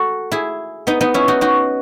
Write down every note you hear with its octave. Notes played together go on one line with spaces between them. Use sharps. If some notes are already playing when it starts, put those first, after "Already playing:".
Already playing: F#4 A4
E4 G#4
B3 D#4
B3 D#4
C#4 E4
D#4 F#4
D#4 F#4